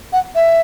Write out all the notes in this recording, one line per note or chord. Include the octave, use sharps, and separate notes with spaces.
F#5
E5